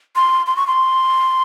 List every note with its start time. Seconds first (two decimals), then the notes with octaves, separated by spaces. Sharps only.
0.16 C6
0.46 C6
0.56 C#6
0.67 C6